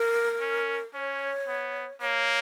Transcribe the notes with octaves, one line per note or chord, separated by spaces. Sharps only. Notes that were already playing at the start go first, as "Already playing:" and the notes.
Already playing: A#4
C#4
C#4 C#5
B3
A#3 C#5